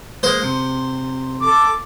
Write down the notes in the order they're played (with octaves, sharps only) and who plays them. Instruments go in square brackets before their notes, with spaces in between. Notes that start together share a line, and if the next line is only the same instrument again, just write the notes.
[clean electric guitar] G#3 A#3 [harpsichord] C5
[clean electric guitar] C3
[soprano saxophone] A4 [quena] D6